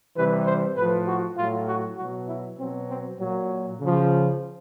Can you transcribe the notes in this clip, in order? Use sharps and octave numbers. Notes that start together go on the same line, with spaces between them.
C3 E3 G3 B4
C5
A2 F3 B4
F#4
A2 F#3 F4
F#4
B2 F#3 F#4
E4
B2 F#3 C4
C4
A#2 F#3
C#3
F3